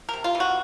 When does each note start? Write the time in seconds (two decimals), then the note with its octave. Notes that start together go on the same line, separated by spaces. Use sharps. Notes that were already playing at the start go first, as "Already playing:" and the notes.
0.09 C3 A#4
0.24 F4
0.35 E3
0.40 F#4